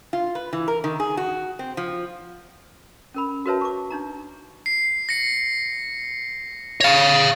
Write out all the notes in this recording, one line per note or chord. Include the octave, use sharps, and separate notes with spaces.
F4
B4
E3
A#4
D#3
G#4
F#4
C4
F3
C#4 A#4 B5
F#4 A#4 B4 C#5 E5 A5
C#6 D6
D4 D#4 A#5
C7
A#6 C#7
C#5 F5 A6 A#6